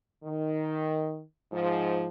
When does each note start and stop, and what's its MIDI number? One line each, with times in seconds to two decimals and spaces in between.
0.24 1.21 51
1.52 2.07 44
1.52 2.07 53